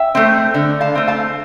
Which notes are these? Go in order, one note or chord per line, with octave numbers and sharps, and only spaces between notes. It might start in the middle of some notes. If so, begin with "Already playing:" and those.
Already playing: E5 G5
A3 C4
D3
F5 A5
A3 C4
F5 A5